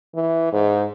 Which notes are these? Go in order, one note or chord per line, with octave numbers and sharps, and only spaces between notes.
E3
G#2